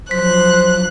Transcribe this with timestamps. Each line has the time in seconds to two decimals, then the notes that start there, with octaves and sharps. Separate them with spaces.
0.11 F3 F#3 C5 F#6 B6